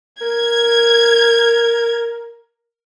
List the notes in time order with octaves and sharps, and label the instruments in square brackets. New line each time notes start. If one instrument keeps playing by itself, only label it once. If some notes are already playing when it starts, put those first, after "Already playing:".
[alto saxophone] A#4 [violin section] G#6